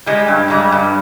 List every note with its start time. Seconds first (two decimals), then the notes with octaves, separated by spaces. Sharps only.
0.06 G3 G#3
0.28 G2
0.50 G3 G#3
0.72 G2